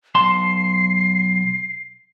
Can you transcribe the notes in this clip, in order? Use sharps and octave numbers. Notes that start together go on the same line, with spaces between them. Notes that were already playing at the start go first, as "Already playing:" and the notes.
B1 A5 C6 C7